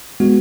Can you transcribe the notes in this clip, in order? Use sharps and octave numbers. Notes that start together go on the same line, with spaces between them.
G#3 B3 F#4